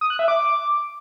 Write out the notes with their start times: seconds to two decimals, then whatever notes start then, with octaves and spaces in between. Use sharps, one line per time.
0.01 D#6
0.10 F#6
0.19 E5
0.28 D6